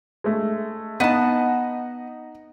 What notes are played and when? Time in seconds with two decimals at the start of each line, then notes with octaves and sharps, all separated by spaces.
0.24 G#3 A3
1.00 B3 D#4 D#5 F#5 A5